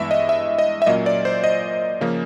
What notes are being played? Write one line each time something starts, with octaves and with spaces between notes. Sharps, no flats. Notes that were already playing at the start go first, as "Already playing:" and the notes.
Already playing: G2 E3 G#3 B3 E5
D#5
E5
D#5
E5
A#2 F#3 A#3 C#4 D#5
D5
C5
D#5
C#3 F3 A#3 C#4